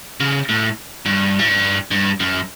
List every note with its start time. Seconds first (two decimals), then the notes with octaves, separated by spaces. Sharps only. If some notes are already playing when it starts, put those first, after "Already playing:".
0.20 C#3
0.49 A2
1.06 G2
1.39 A2
1.48 G2
1.91 G2
2.20 F#2